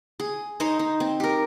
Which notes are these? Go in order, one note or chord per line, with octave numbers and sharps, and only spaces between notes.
G#4
D#4 C5 C#5 D#5
D#4
C4
G4 A#4